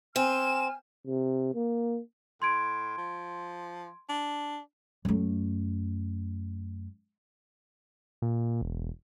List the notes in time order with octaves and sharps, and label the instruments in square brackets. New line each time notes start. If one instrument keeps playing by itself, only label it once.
[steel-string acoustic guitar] C4 [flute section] G#5 F6 [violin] E7
[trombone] C3
A#3
[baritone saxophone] A2 [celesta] C6 G#6 D7
[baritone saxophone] F3
D4
[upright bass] F#2 A3
[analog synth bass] A#2
E1